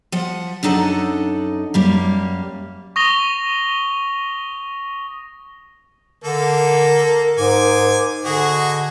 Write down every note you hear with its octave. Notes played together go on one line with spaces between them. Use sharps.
F3 F#5
F#2 D4 D#4 A4 F#5
F#2 G3 A#3
C#6 D#6 A#6 F7 G7
D3 A#3 A4 A#4
G#2 G#5 D6
D3 F#4 G#4 D#5